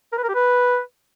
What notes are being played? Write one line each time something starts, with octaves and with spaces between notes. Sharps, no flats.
A#4
B4
A#4
G4
B4